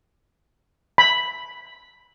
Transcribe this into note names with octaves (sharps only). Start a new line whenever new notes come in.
B5